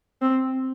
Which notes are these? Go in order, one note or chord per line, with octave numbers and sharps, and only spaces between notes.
C4